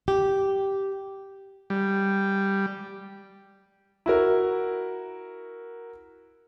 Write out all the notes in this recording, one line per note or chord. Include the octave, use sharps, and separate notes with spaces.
G4
G3
E4 F#4 A#4